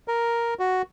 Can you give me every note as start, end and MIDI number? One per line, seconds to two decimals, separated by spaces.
0.08 0.54 70
0.59 0.82 66